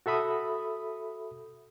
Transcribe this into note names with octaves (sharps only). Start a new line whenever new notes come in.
F#4 A4 E5 B5 D#6